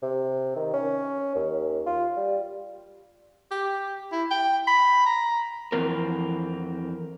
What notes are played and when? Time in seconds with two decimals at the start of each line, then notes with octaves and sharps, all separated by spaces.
0.02 C3
0.56 D#3
0.74 C#4
1.35 D#2
1.86 F4
2.17 G3
3.51 G4
4.12 E4
4.31 G5
4.67 B5
5.06 A#5
5.72 F2 A2 E3 C4 A#4